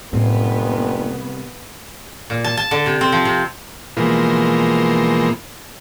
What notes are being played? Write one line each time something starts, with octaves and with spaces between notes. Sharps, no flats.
F#1 A2 C3 G3 B3 C4
A#2
A5
A5
D3
C3
C4
F3
C3
B2 E3 F3 G#3 A#3